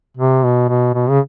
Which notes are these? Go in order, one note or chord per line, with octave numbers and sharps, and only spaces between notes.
C3
B2
B2
B2
C#3